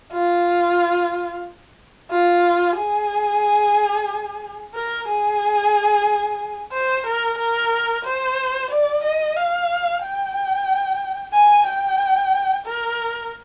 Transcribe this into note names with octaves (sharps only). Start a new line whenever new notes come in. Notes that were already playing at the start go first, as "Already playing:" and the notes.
F4
F4
G#4
A#4
G#4
C5
A#4
A#4
C5
D5
D#5
F5
G5
G#5
G5
A#4